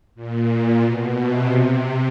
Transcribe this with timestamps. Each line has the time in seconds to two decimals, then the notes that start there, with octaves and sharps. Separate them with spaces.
0.15 A#2
0.82 B2
1.17 C3
1.49 C3